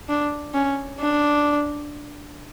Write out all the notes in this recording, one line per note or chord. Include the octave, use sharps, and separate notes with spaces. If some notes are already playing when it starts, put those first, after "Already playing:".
D4
C#4
D4